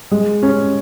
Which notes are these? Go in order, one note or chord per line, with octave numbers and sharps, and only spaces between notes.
G#3
C#4